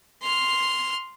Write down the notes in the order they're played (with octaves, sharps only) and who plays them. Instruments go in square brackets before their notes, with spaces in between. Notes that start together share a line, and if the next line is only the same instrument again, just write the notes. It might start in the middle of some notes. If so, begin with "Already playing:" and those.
[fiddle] C6 F6